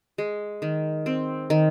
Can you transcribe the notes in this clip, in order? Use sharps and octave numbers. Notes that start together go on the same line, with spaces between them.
G#3
D#3
C4
D#3